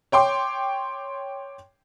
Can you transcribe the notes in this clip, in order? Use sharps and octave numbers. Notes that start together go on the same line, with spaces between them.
C#5 G5 C6 D6